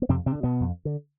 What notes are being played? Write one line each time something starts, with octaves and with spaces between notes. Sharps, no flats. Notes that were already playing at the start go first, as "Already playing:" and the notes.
B3
F2 C3 C4
C3 C4
D3
B2 B3
F2
D3